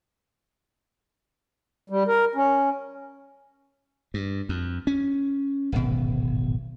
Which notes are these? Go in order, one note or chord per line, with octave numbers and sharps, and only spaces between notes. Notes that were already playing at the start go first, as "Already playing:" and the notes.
G3
A#4
C#4
G2
F2
C#4
D1 G#1 B2